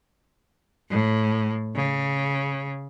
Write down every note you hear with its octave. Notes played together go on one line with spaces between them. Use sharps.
A2
C#3